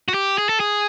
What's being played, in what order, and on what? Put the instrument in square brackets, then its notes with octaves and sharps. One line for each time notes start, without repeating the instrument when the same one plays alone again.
[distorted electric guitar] F#4
G4
G#4
A4
G#4